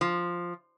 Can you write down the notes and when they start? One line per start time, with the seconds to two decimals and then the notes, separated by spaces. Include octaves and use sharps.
0.01 F3